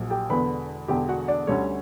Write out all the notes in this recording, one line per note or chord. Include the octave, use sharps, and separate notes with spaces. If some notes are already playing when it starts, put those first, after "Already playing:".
Already playing: A#1 A#2 F#3
G4 G5
E1 E2 D3 B4 B5
E1 E2 D3 G4 G5
F#4 F#5
D4 D5
D2 D3 G3 C#4 C#5